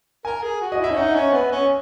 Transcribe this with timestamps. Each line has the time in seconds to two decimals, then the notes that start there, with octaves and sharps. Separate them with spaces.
0.25 A#4 G#5
0.43 G#4
0.61 F#4
0.72 D#5
0.79 E4
0.84 E5
0.90 C#4
0.97 D#4 F#5
1.14 C#4
1.33 B3
1.51 C#4